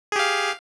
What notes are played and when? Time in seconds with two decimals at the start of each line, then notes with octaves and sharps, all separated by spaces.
0.12 G#4
0.16 G4
0.19 F5